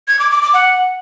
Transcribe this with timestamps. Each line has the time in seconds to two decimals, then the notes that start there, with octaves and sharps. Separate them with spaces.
0.08 G#6
0.19 D6
0.31 D6
0.42 D6
0.54 F#5